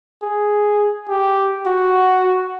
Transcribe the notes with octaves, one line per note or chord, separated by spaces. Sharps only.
G#4
G4
F#4